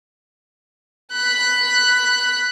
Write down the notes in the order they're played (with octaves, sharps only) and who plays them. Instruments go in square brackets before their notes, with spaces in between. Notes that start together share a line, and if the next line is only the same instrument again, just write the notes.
[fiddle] B5 F#6